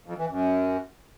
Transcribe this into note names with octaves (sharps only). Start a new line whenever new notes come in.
F2
E3
F#2